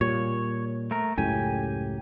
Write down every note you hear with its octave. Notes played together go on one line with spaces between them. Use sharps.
A#2 G3 C#5
A3 A#4
C#2 F#2 A2 G4 G#5